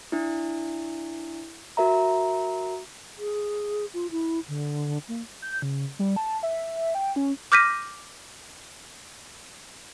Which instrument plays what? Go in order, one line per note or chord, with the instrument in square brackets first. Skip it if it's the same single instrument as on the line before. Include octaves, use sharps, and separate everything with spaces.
[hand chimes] D4 E4
F#4 A#4 E5 A#5
[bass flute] G#4
F4
E4
D3
A#3
[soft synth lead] G6
C#3
G3
A5
E5
G5
C#4
[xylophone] D6 F6 G6 A#6 B6 D#7